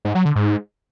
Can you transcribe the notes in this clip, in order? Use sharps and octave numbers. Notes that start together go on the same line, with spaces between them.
G#2
F#3
D3
G#2